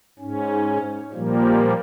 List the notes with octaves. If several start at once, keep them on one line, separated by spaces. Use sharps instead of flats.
G#2 C#4
A#2 F3 G3 A#3